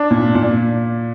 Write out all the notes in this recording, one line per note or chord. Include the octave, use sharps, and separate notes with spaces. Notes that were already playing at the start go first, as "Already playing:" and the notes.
Already playing: D4
A#2
A#2